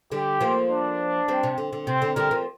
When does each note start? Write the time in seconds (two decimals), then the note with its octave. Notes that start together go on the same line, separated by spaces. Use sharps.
0.12 D3 G3 G4
0.41 F3 A#3
0.70 D4
1.28 G3 C4
1.43 C3
1.58 D3
1.73 D3
1.87 C3 C4
2.02 D3
2.16 D3 G3 A#4
2.31 F3 A#3